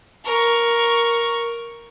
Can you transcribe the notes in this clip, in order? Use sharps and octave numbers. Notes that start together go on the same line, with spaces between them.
A#4 C#6